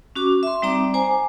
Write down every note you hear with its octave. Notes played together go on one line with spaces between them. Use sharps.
C#4 F#4 D6
E5 C6
G3 C4 D#4 D5 A#5 D6
C5 G#5 A#5 D6